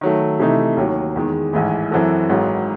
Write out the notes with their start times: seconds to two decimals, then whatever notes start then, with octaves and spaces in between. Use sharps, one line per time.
0.01 D#3 F#3 A3
0.39 C3 E3 A3 D#4
0.77 D#2 D#3 F#3
1.16 E2 D#3 G#3
1.53 A1 G#2 E3
1.91 F#2 E3 C4 F#4 A4
2.29 G#1 G#2 F#3